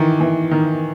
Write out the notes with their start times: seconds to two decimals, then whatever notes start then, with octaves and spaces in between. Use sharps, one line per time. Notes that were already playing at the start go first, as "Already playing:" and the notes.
Already playing: D#3 E3
0.20 E3
0.51 D#3